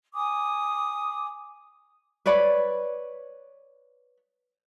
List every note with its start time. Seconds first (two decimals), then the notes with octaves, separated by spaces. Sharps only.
0.14 G#5 D6 D#6
2.26 B4 C#5 D5 B5